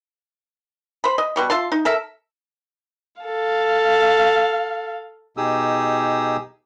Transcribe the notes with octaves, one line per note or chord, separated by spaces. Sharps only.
C5 B5
D#5
B2 G3 C#6
F4 E5 A5 C6
D#4
A4 A#4 E5
A4 F5
B2 D#4 G4 G#4 D#6 E6